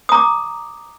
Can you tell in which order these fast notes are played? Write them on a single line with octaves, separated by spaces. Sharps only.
D#6 A#5 D6